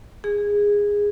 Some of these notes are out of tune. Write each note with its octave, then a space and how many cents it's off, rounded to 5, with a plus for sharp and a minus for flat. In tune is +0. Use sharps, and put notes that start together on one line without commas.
G#4 -15